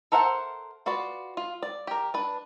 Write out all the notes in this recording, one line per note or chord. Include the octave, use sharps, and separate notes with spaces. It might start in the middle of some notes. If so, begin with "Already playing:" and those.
A4 A#4 C5 E5 F#5
F4 F#4 B4 D5
F4
D5
G4 A#4
D4 B4